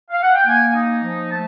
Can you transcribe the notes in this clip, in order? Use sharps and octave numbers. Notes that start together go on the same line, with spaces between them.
F5
F#5
G5
A#3 G#5
D#4
F3
A3 A5